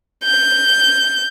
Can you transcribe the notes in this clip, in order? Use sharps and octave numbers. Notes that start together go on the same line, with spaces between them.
G6